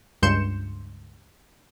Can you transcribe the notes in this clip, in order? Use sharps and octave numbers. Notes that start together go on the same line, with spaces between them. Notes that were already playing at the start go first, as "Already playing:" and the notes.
C#2 G2 C6 G6 C#7 E7